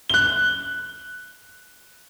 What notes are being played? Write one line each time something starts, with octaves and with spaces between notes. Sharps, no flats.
F#6 G7